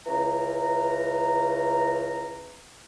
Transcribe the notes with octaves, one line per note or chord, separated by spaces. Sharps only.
C#2 E3 A#5